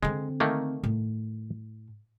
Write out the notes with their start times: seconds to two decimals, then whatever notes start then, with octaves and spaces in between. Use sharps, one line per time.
0.03 D3 G#3 C4
0.40 D#3 A3 A#3
0.83 A2